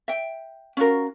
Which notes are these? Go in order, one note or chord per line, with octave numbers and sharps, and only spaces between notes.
E5 G5
C#4 F4 F#4 A#4